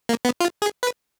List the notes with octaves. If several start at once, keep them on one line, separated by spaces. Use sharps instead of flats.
A#3
B3
F4
G#4
B4